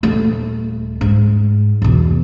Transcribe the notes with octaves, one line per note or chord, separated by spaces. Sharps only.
D#1 A3
G#2
E2 B2